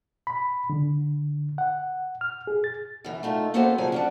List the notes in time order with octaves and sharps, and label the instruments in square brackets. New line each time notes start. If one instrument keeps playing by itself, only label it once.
[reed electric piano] B5
D3
F#5
F6
G#4
A6
[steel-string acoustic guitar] F#2 E3
A3 D#4 F4
A#3 B3 C#4 F#4 A4 C5
C#3 F3 F#3 G#4 F#5 G#5
C#4 D4 F#4